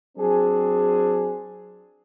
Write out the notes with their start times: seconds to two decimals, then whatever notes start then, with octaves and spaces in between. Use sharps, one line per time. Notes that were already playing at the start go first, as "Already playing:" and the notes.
0.18 F#3 C4 D4 G#4